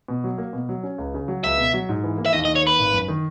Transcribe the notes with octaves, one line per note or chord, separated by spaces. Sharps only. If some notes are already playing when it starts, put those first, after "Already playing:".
B2
F#3
A#3
B2
F#3
C#4
C#2
C#3
F#3
C#2 E5
B2
F#3
G#2
E3
A#3
E5
D#2 D#5
D#5
D#3
C#5
A#3 B4
G#1
F#2
D#3